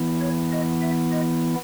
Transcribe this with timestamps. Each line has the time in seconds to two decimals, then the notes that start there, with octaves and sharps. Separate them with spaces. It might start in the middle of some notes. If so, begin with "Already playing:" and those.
Already playing: E3 B3 E4
0.20 C#5
0.52 D#5
0.82 E5
1.12 D#5